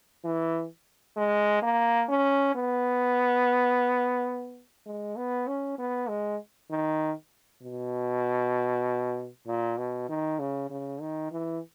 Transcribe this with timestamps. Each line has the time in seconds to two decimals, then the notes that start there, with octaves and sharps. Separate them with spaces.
0.24 E3
1.17 G#3
1.62 A#3
2.09 C#4
2.55 B3
4.86 G#3
5.16 B3
5.47 C#4
5.78 B3
6.09 G#3
6.70 D#3
7.62 B2
9.47 A#2
9.77 B2
10.09 D#3
10.39 C#3
10.70 C#3
11.01 D#3
11.32 E3